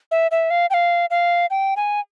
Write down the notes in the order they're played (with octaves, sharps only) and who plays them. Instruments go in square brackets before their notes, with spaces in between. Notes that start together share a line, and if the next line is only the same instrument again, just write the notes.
[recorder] E5
E5
F5
G5
F5
F5
G5
G#5